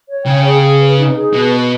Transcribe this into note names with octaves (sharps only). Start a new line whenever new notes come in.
C#5
C#3 G5
G#4
G#4
B4
D#4
G#4
B2 B4
B4